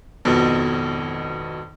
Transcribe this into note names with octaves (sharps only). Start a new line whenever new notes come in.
G#1 F2 B2